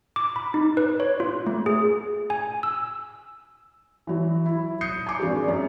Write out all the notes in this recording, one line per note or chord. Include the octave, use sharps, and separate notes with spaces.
D6
B5
D#4
B4
C#5
F4
A3
G#4
G#5
E6
E3 F#3
E4
D#6 G6 C7 C#7
G#5 D6
G#1 D4 F#4 G#4
F#2